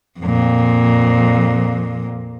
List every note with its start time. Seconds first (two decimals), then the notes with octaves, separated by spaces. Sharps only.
0.20 F2 A#2